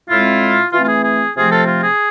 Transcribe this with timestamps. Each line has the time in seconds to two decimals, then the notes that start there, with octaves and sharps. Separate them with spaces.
0.09 A2 G#3 C4 E4 F4
0.73 E3 A3 C4 F4
0.84 F4
0.89 G#4
1.04 G#4
1.36 C3 F3 A3 C4 F4 G#4
1.51 F4 A4
1.67 F4
1.83 G#4